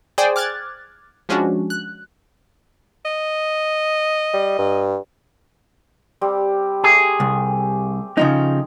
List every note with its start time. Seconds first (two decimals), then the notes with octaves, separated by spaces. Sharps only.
0.18 G#4 C5 D5 G5 G#5
0.36 D6 F6 F#6 G#6 A6
1.29 F3 G#3 C#4 D4 F#4
1.70 F#6
3.05 D#5
4.34 G3
4.59 G2
6.21 G3 C4 G4
6.84 A3 G4 G#4
7.20 C2
8.17 C#3 F3 D#4